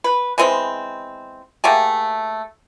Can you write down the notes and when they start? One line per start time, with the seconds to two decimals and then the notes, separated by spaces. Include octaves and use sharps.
0.04 B4
0.38 E3 G#3 B3 C4
1.64 A3 A#3 G4 G#4